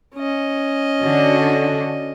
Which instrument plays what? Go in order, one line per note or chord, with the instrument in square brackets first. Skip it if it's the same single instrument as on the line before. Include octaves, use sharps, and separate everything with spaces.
[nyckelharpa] C#4 D#5
[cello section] D3 D4 F#4